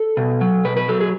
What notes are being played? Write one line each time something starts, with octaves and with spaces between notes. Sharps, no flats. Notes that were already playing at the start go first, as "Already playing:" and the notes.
Already playing: A4
B2
F#3
B2 B4
B4
F#3 A4
G#4